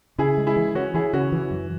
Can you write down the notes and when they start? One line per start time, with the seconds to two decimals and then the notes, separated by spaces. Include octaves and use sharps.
0.18 C#3 E4 G#4
0.38 G#3
0.47 E4 G#4
0.56 E3
0.75 E3 C#4 F#4
0.94 E3 E4 G#4
1.13 C#3 C#4 F#4
1.32 E3
1.51 F#2